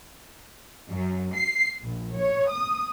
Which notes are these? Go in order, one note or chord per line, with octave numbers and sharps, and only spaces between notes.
F#2
C7
A#1
C#5
D#6